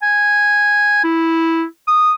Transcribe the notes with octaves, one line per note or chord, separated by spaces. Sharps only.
G#5
E4
D#6